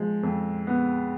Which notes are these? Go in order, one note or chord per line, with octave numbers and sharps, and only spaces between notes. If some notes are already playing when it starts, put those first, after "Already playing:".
Already playing: F3 G#3
F2
B3